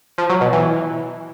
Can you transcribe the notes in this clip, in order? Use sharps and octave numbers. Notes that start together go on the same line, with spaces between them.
F3
F#3
B2
E3